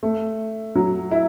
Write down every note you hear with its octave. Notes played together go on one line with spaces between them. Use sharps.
A3
F#3
E4